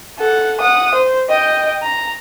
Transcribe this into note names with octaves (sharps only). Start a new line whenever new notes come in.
A4 F#5
F#5 D#6
C5
D#5 G5
A#5